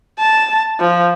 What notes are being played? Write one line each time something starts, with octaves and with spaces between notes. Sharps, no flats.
A5
F3